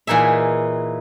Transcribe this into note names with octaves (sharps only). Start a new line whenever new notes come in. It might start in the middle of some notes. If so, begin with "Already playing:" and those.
A#2 E3 D#4 G#4 E5